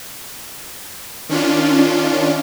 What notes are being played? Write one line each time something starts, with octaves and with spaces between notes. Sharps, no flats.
D#3 C#4 D4 F4